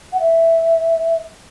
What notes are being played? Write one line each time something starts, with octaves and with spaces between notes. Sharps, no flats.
F#5
E5